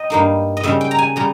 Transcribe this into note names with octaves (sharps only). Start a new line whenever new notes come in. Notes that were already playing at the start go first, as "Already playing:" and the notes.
Already playing: D#5 G5
G2 G3 A#3 D#4
D#5
C#3 G3 C#4 E5
G5
A#5
G#5
C#3 G3 C#4 A#5